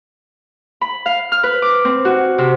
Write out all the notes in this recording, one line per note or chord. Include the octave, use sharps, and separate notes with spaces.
B5
F5
F6
B4
D6
C4
F#4
C3